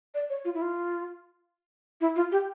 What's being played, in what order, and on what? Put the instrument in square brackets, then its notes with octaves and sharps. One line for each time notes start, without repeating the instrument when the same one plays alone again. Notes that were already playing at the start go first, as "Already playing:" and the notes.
[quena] D5
C#5
F4
E4
F4
E4
F4
G4